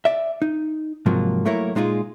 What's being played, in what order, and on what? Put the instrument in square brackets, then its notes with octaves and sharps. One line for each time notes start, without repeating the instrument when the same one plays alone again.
[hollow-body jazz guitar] D5 E5
D#4
G#2 C3 F3 F#3 A#3
F#3 A3 A#3 E4 A#4 C#5
A#2 G#3 D#4 F4 G#4